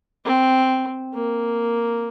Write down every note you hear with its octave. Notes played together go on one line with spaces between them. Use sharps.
C4
A#3